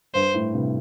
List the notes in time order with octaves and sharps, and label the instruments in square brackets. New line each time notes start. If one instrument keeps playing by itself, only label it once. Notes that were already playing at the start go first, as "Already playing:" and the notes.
[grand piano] G2 [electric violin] C5
[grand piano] A2
G2 C3